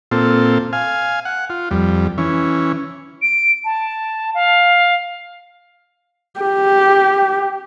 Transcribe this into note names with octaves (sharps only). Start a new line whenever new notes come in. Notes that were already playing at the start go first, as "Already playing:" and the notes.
A#2 C4 F4 A4
F5 G#5
F#5
F4
F2 G3
E3 C#4
D7
A5
F5
G4